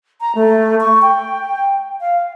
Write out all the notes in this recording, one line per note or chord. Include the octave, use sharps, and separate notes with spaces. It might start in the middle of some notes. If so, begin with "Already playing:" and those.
A#5
A3
C#6
G5
F5